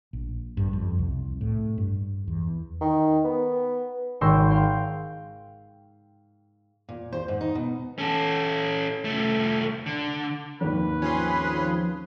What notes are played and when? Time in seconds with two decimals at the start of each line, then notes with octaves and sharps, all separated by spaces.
0.13 A#1
0.57 G2
0.73 F2
0.99 C2
1.41 A2
1.78 G2
2.28 E2
2.81 D#3
3.24 B3
4.21 G#1 C#5 G5 C6 E6 A#6
4.50 F5 G5 C6
6.89 A#2
7.12 C5
7.28 G#2
7.41 D#4
7.55 B2
7.98 C#4 A4
9.05 C2 A3
9.86 D3
10.61 G#1 D#2 B4
11.02 F3 C#4 G#4 C6